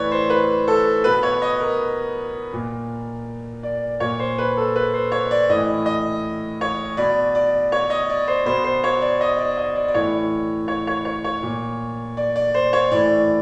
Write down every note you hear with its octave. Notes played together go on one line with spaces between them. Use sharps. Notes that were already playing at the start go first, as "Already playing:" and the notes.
Already playing: A2 E3 B4 C#5 D5
C5
B4
A4
B2 B4
C#5
D#5
A#4
A#2
D5
A#2 C#5
C5
B4
A4
B4
C5
C#5
D5
A2 E3 D#5
D#5
C#5
B2 D5
D5
C#5
D#5
D5
C5
B2 C5
C5
C#5
D5
D#5
D5
D#5
D5
D5
A2 E3 C#5
C#5
C#5
C#5
C#5
A#2
D5
D5
C5
C#5
A2 E3 D5